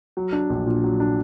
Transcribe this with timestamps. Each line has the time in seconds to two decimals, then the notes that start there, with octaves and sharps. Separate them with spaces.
0.17 F#3
0.33 D4
0.50 A#1
0.66 A#2
0.84 F#3
1.00 D4